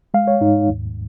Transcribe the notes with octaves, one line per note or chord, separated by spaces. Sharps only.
G#3 F5
C#5
G#2 D#4
D#2